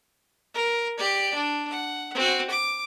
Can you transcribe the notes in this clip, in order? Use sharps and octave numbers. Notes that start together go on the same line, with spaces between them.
A#4
G4 D5
D4
F#5
C4 F#4
D6